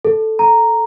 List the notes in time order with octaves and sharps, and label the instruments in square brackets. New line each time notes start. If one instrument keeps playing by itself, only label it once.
[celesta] A4
A#5